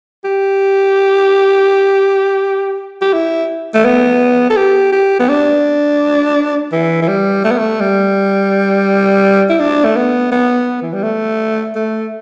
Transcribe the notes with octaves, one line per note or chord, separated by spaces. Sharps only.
G4
G4
E4
A3
B3
A4
G4
G4
B3
D4
E3
E3
G3
A3
B3
A3
G3
E4
D4
A3
B3
B3
E3
G3
A3
A3